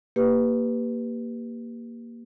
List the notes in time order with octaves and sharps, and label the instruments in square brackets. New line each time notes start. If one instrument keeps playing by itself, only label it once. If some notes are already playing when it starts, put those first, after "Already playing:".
[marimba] A#3 G4 B4